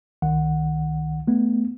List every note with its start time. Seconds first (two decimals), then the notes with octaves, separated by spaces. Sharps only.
0.22 C2 D#3 F#5
1.27 A3 B3